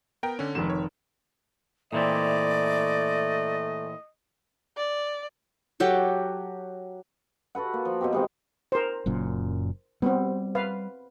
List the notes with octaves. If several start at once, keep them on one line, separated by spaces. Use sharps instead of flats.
B3 A#4 G5
D3 C#4
F1 G#2 D#3 E7
C#5
A#2 E3 A3 C4 D5 D#5
D5
F#3 G4 A4
F#4 A4 B4 F#5
A#3
F3
B2 A#3 C4 G4
G#2 E3 C4
A#4 C5
F#1 F#2 A#2
G3 B3 C4
B4 F5